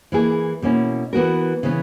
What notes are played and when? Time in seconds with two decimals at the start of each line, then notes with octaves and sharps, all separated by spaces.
0.12 E3 A#3 E4 G#4
0.62 B2 A#3 C#4 E4
1.13 E3 B3 F#4 A#4
1.63 C#3 E3 B3